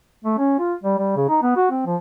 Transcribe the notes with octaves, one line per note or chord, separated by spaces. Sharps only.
A3
C#4
F4
G3
G3
C#3
D#4
B3
F#4
C4
F3